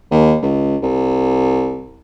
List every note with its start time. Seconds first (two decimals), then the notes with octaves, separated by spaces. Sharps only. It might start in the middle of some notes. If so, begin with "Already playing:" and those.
0.12 D#2
0.42 C#2
0.82 C2